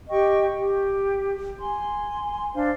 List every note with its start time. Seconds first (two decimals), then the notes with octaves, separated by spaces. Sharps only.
0.09 G4 D#5 G5 C#6
0.58 G4
1.60 G#5 C6
2.55 D4 C5 F5